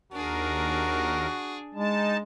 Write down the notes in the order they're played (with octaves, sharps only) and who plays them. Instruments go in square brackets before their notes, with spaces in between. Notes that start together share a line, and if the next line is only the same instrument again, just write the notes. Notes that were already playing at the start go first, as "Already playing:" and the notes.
[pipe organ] D#2 A#4 [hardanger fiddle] D4 G#4 [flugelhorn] F#4
[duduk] G#3 [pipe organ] D#4 A5